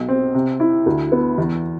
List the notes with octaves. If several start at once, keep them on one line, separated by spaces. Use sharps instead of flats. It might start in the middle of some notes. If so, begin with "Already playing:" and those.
Already playing: B1
C4
C3
E4
D2
B3
E2